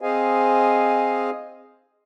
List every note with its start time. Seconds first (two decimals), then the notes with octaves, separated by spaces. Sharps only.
0.01 C4 G#4 C5 D#5 F5 G#5